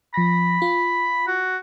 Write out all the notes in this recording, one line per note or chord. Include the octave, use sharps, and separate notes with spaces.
F3 B5 A#6
F4
F#4